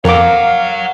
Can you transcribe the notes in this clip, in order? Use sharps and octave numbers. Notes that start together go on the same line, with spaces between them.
F2 A#4 C#5 F5 F#5 D6